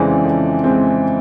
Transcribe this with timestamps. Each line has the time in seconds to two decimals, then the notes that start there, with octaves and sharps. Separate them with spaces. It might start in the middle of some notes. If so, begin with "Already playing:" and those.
Already playing: F2 C#3 E3 G#3 C4 D5
0.24 F2
0.64 G#3 C4